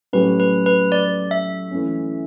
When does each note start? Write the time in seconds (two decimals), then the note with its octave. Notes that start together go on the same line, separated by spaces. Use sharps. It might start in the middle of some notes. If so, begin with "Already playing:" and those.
0.13 A2 F#3 C#4 G4 B4
0.40 B4
0.66 B4
0.92 D5
1.31 E5
1.71 E3 A3 C#4